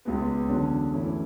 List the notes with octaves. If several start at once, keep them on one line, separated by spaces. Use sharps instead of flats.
C#2 B2 G#3 B3
E2 D3 F#3 C#4
F#2 E3 A3 C#4 E4